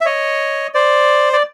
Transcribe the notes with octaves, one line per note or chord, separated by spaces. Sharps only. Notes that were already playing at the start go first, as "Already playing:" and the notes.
E5
C#5 D#5
C5 D5
D5